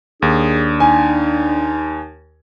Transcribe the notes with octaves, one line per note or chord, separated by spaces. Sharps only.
D#2 D4 G#4
D#4 G#5